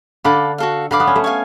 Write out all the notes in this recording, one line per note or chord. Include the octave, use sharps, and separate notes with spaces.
D3 A4 F5 B5 D6
F#4 A4 F5
D3 B4 F5 B5 D6
B3
C#4
A3
C#5 F5 G#5